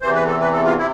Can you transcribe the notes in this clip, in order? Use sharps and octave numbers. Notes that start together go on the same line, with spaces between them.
E2 C3 E3 C5
B4
A4
B4
A4
F4
C3 E4